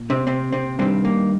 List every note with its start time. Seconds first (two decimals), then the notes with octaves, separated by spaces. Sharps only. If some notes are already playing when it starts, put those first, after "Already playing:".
Already playing: A#2
0.10 C3 C4
0.27 C3 C4
0.52 C3 C4
0.79 G2 C3 D#3 C4
1.05 A#3